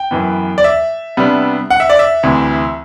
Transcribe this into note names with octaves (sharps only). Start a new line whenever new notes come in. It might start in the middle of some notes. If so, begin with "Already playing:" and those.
Already playing: G5
F#2 E3 B3
D5
E5
C3 G3 B3 D4
F#5
E5
D5
E5
D2 C3 E3